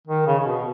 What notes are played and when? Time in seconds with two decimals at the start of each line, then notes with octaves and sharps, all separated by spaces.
0.07 D#3
0.27 C#3
0.39 C#3
0.46 B2